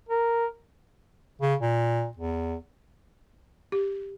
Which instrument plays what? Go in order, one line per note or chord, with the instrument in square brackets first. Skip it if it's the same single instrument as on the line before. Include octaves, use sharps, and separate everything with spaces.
[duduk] A#4
[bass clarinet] C#3
A#2
E2
[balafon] G4